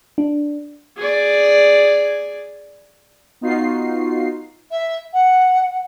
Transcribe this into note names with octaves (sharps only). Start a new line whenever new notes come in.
D4
G#4 D5
B3 D#4 F4 F#4 C7
E5
F#5